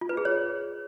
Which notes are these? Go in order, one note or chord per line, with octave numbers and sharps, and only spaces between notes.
F4
B4
G#4
C#5